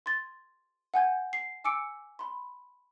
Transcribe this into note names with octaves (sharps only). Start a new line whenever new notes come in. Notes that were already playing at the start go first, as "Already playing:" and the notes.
C6 G#6 A6
F#5 G#5 G6 G#6
C7
G#5 D6 E6 C#7 D7
B5 C6